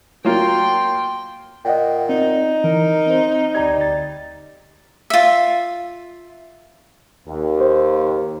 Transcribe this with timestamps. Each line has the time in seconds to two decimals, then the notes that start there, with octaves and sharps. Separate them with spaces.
0.25 F#3 A#3 F4 G5 C6
1.65 A#2 D#5 F#5 G5
2.09 C4 D#4
2.64 E3 A#4
3.07 C4 C5
3.55 D2 G3 A#5 G#6
3.78 D2 A6
5.10 F4 E5
7.27 D#2
7.61 C5